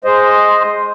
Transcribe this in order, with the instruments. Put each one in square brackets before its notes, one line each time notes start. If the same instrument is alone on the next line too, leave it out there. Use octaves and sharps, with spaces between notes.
[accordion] G#3 C5 D#5